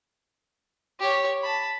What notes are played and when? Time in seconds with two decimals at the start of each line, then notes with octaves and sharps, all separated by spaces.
1.00 G4 C#5
1.42 A5 B5